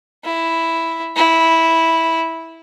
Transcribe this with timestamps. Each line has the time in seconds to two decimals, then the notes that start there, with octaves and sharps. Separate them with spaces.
0.24 E4
1.16 E4